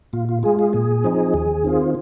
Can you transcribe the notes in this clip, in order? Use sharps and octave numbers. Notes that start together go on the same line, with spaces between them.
A#2 F4
F4
G#3 F4 G#4
G#4
A#2 G#4
F3 C4 D#4
D#2
D#3 C4 F4